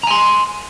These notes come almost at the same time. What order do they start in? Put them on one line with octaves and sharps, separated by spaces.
A#5 G#5 C6